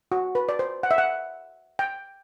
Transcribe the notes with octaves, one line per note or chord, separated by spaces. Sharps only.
F#4
B4
D5
C5
F#5
E5
F#5
G5